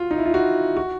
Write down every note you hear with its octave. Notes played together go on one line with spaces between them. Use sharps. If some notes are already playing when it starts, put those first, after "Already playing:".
Already playing: F4 F#4
D#4
E4
F4
F#4
F#4